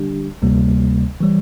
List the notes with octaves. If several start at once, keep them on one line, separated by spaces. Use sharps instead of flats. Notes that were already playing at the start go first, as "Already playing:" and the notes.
Already playing: D3 G3 D4 G4
D2 C3 G3 A#3
E3 G3